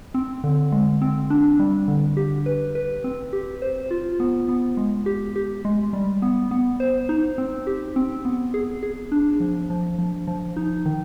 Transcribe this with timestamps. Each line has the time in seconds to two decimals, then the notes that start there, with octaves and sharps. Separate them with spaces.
0.14 C4
0.44 D3
0.72 G#3
1.01 C4
1.30 D4
1.59 G3
1.88 D3
2.17 G4
2.46 B4
2.75 B4
3.04 C4
3.33 G4
3.62 C5
3.91 F4
4.20 B3
4.48 B3
4.77 G#3
5.06 G4
5.36 G4
5.65 G#3
5.93 G3
6.22 B3
6.51 B3
6.80 C5
7.09 D#4
7.38 C4
7.67 G4
7.96 C4
8.25 B3
8.54 G#4
8.83 G#4
9.12 D4
9.40 F3
9.70 F3
9.99 F3
10.27 F3
10.56 D#4
10.86 D#3